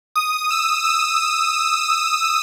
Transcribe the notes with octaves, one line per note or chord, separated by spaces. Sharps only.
D#6
E6
E6